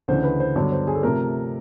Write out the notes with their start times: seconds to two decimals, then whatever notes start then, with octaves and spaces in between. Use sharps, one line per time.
0.08 D2 C#3 E3 C5
0.24 B4
0.40 C5
0.56 G2 D3 F#3 B3 C#5
0.72 C5
0.87 G#4
0.95 A4
1.03 C3 F3 A3 A#4